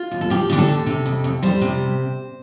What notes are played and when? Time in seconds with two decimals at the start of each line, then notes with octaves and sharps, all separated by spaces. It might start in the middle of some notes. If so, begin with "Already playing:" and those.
Already playing: F4
0.11 D#2
0.21 A4
0.30 F3 G4
0.50 D3 G4
0.59 A4
0.68 D#2
0.86 C3
1.06 F2
1.24 F2
1.42 G3 C5
1.61 C3